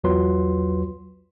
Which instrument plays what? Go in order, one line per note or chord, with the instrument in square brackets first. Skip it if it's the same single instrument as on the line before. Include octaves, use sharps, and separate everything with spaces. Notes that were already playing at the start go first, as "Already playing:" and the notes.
[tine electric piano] B1 E2 F#3 F4 B4 C6